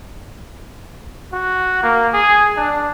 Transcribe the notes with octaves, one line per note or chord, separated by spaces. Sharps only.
F#4
A#3
G#4
D4